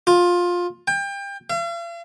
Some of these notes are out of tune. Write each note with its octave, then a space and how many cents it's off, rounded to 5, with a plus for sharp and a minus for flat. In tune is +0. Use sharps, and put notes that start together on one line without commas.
F4 +15
G5 +30
F5 -45